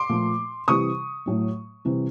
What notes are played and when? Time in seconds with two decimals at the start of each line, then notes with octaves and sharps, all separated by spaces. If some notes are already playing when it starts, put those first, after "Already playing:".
Already playing: C6 D6
0.09 A#2 F3 A3
0.68 C3 E3 G3 C#6 D#6
1.26 A2 F#3 A3
1.85 C3 E3 G3